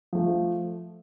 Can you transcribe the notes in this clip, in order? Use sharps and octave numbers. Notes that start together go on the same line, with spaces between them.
F3 A3